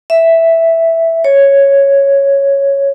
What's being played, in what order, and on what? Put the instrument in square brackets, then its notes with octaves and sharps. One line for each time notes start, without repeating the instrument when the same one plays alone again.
[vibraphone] E5
C#5